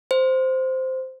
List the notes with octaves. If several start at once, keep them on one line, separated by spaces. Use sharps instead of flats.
C5